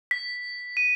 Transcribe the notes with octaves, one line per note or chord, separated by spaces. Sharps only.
B6
D#7